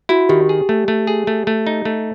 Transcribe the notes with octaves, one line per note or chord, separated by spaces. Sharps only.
E4 F#4
D#3 G4
G#4
A3
A3
G#4
A3
A3
D#4
A3